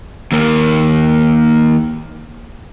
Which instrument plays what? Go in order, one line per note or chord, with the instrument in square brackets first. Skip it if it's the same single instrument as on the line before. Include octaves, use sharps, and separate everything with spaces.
[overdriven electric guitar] D#2 A#3